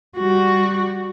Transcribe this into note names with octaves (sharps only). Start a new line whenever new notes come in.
G3 F#4